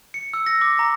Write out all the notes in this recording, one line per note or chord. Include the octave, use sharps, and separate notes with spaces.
C#7
E6
A#6
D6
A#5